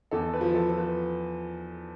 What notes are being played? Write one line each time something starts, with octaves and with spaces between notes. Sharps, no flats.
E2 A4
B4
F3
A4
F3
B4